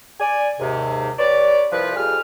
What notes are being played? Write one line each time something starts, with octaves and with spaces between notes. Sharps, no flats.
D5 G#5
D#2 G#2 C3
G3 B4 C#5 D5
C2 F3 B4
F2 F3 G3 G#4 F6